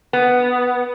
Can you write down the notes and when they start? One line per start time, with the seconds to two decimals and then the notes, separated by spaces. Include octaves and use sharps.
0.13 B3